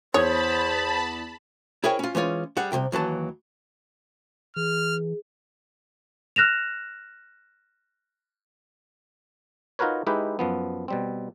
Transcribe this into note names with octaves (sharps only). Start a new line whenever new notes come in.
E2 C5 C#5 A5 B5 D#6 G#6
E4 G#4 A#4 C#5 G5
C#4 F4
E3 G#3 C#4 F4
G3 G#4 F#5
C2 F#2 C3 G5
D#2 E3 F#3 A5
E3 G#4 F6
F6 F#6 A#6 E7 F7
D#4 F4 F#4 A#4 B4 C#5
G#3 D#4 E4 G4 B4
F#2 F3 B3
B2 G3 C4